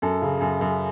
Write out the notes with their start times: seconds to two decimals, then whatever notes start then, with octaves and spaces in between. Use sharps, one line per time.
0.02 F#2 A4
0.22 C#3
0.41 F#2
0.61 F#2